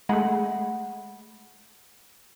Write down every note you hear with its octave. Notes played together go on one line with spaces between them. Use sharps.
G#3 A3 F#5 B5